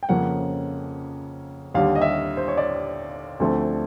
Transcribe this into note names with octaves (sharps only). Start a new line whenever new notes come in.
G5
F2 C#3 F3 A#3 C#4 F#5
D#2 D3 G3 F5
D#5
E5
C5
C#5
D5
D2 D3 F3 A3 C4